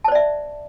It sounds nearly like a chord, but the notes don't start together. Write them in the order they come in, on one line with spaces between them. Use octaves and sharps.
A5 C5 D5 E5